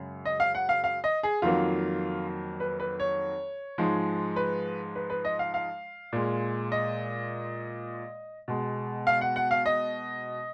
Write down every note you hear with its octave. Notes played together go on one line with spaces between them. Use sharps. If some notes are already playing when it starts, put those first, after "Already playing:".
Already playing: F#2 C#3 G#3
D#5
F5
F#5
F5
F5
D#5
G#4
F2 D#3 F#3 A#3 F4
B4
B4
C#5
G#2 F3 G#3
B4
B4
B4
D#5
F5
F5
A#2 G#3
D#5
B2 G#3
F5
F#5
F#5
F5
D#5